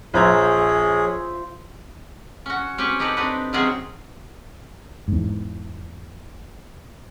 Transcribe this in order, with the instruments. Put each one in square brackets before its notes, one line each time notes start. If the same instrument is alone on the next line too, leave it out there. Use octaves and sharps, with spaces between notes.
[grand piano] A#1 A#5 G#6 [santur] F4 C5 E5 [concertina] G#4 C#5
[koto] C#4 F#4
C4 C#4 G4 B4 C#5
D#4 G4 A4 B4 C#5 D5
C4 D4 D#4 B4
C3 D#3 F#3 C4 C#4 G#4
[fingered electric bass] E2 G#2